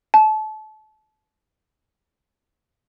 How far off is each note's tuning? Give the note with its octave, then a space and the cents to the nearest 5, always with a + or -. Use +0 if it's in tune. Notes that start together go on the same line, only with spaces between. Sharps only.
A5 -30